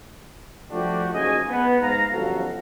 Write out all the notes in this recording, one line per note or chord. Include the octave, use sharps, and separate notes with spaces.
F3 G3 A3 D4 F#4 G4
F#1 G#2 C#3 G#3 D#5 G#5
B3
G#2 F5 A#5
G1 F#2 F3 F#4 A4 F5